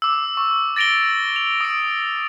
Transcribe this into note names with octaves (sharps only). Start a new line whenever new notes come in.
D6 E6
C#6
A6 A#6 D7 F7 G7
F7
D#6 D7